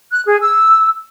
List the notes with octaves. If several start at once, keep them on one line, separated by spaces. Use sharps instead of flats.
F#6
G#4
E6